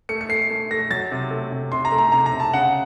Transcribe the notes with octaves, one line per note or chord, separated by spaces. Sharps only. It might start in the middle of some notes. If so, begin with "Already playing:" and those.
A3 C#7
C#7
A3 C7
A3
A3 A#6
F#3 A6
C3
A3
C3
C3 C6
A#5
A3
A#5
C3 A#5
A#5
C3
A5
C#3 F#5